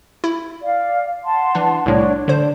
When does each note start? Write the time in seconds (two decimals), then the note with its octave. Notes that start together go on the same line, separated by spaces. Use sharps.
0.24 E4
0.62 D5 F5
1.24 F#5 A5 C6
1.55 E3 D4
1.86 C2 A2 D4 C#5
2.28 D3 D4 C5